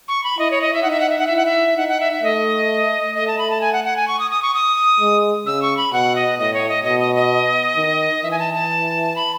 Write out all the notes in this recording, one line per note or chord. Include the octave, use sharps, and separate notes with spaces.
C#6
B5
E4 D#5
C#5
D#5
E5
D#4 F#5
E5
F#5
E5
F#5
E5
E4
F#5
E5
D#4 F#5
F#5
E5
E5
A3 D#5
A3 D#5
A5
B5
A5
G#5
F#5
F#5
G#5
C#6
D#6
D#6
C#6
D#6
G#3
C#3 E6
C#6
B5
B2 F#5
D#5
A2 D#5
C#5
D#5
B2 D#5
D#5
D#5
D#3
E3 E5
G#5
A5
A5
B5